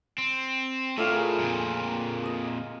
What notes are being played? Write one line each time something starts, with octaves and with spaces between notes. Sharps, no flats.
C4
A2 A3 D4 F4
G#4 A#4
F2 A#2
D#5 D#6